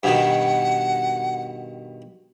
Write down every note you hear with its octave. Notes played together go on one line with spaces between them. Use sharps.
G2 B2 D#3 F#5